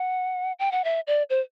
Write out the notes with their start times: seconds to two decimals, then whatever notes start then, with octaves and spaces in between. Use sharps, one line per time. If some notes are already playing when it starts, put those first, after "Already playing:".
Already playing: F#5
0.59 G5
0.72 F#5
0.84 E5
1.07 D5
1.30 C5